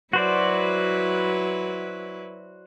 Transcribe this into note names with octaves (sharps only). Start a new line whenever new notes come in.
F#3 E4 F#4 B4 C5 D5